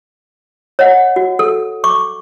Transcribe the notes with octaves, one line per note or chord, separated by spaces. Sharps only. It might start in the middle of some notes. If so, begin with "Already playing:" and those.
C#5 D#5 F#5
F#4
A4
C#6 D6